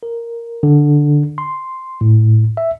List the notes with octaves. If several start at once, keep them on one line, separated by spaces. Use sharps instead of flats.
A#4
D3
C6
A2
E5